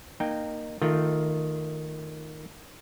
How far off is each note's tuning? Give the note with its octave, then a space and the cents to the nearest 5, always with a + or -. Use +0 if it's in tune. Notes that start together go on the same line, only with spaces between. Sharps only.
A#3 +0 D#4 -20 G5 +0
D#3 +0 A3 +20 F4 -5